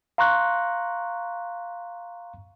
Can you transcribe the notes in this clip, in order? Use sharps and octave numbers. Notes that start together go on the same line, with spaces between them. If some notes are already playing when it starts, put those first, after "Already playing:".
F5 A#5 C6 C#6 F#6